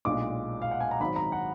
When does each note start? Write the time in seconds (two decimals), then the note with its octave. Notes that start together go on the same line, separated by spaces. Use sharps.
0.05 B1 A#2 G#3 D4 D6
0.62 F5
0.71 F#5
0.80 G#5
0.91 A#5
1.00 G#1 G#2 F#3 B5
1.16 A#5
1.32 F#5